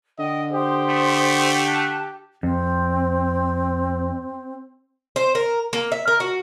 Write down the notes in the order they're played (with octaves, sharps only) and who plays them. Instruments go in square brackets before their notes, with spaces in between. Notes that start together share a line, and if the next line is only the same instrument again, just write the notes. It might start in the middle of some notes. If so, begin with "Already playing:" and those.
[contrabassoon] D3 [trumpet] D#5 [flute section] G5
[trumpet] G4 [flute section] C5 C6 D#6
[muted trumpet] A3
[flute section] A5 F#6
[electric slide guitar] F2 [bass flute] C4
[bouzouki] C5
A#4
A#3
E5
A#4
F#4